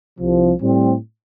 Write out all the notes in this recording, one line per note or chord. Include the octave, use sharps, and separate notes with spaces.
C2 C3 F3
A2 G3 C4